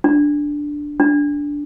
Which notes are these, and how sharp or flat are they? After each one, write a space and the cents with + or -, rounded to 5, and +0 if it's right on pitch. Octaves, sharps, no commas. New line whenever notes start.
D4 +0
D4 -10